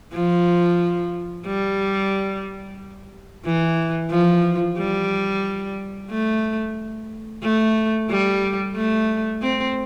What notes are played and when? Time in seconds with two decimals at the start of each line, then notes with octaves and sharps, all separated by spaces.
0.13 F3
1.46 G3
3.45 E3
4.11 F3
4.78 G3
6.10 A3
7.43 A3
8.09 G3
8.75 A3
9.41 C4